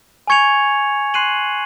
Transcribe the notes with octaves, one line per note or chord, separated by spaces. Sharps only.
G#5 C#6 G#6 C#7 F7
C6 F#6 C7 D#7 F#7